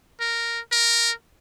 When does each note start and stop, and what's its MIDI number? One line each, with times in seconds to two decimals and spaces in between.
0.20 0.60 70
0.72 1.12 70